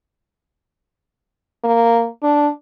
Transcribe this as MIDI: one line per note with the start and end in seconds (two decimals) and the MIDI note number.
1.64 2.07 58
2.23 2.49 62